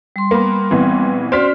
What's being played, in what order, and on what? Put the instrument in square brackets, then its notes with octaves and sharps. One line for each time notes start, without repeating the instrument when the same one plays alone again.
[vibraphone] G3 C6
[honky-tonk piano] A#3 B3
[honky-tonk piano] A#1 E3 [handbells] B3 C4
[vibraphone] C#4 F#4 D5 [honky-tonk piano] C5 F6 B6